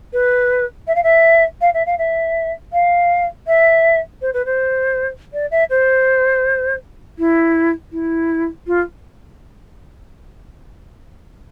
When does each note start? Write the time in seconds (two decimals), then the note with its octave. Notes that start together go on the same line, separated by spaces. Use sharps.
0.13 B4
0.87 E5
0.95 F5
1.03 E5
1.61 F5
1.74 E5
1.86 F5
1.98 E5
2.72 F5
3.47 E5
4.21 C5
4.33 B4
4.45 C5
5.33 D5
5.51 E5
5.70 C5
7.18 E4
7.92 E4
8.67 F4